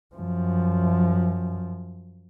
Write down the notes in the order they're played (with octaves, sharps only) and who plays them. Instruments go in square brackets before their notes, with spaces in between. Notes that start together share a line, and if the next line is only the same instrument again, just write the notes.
[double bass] F#2 F3